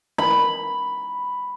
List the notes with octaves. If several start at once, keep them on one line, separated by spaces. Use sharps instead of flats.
B5